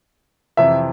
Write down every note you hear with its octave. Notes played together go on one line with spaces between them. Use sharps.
F2 C3 E3 E5